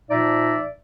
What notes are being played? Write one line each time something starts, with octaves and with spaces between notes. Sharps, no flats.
A#2 F3 D#4 D5 E5